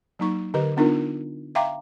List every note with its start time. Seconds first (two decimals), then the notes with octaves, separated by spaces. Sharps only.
0.19 F#3 A#3 D#4 C#6
0.54 D3 G4 A#4 B4 D#5
0.77 B3 D4 D#4 F4 A#4
1.55 E5 F5 G5 A#5 C6 D6